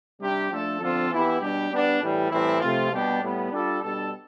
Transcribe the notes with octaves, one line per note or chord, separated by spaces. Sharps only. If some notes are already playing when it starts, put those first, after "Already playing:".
C3 G3 D4 G4
F3 A3 D4 A4
D3 F3 C4 F4 A4
E3 B3 E4 G4
B2 G3 D4 G4
G3 B3 D4
A2 E3 G3
A2 E3 G3 C4 E4
C3 F3 A3 C4 F4
B2 G3 B3 D4 G4
A2 G3 B3
G3 D4 F4 A4
B2 G3 D4 A4